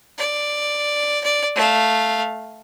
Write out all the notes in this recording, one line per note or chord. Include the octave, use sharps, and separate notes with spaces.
D5
D5
A3 F5